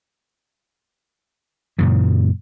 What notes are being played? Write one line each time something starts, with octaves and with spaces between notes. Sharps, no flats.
F#2 A#2 C#3 E3